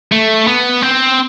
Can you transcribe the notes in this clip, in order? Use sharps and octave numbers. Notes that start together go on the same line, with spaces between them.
A3
B3
C4